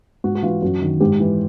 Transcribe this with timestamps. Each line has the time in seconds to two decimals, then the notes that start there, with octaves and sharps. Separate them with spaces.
0.24 G#2 F#4
0.35 F#4
0.43 E3 F4
0.62 F#2 F#4
0.82 D#3
1.00 G#2 G4
1.20 E3